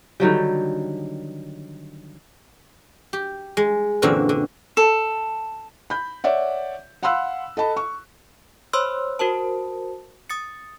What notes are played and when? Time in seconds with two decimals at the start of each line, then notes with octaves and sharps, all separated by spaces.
0.20 D3 D#3 F#3 G3
3.13 G4
3.57 G#3
4.02 F#2 A#2 D3 E3 C4 F#4
4.29 D3
4.77 A4
5.90 B5 G6
6.24 C#5 D5 E5 F#5
7.03 F5 F#5 B5 C6 E6 F#6
7.57 A4 D#5 A5 B5
7.77 C#6
8.73 C5 C#5 B5 C6 E6 F6
9.19 F#4 A#4 C5 A5
10.30 D#6 A6 C#7